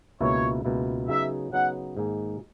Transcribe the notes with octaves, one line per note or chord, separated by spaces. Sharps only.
C#2 B2 A#3 E4 C#5
C#2 B2 A#3 E4
C#3 F#3 B3 D#4 E5
C#3 F#3 B3 D#4 F#5
G#2 D#3 A#3 D#4 G#4